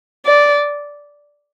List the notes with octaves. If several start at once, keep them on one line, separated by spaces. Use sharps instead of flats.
D5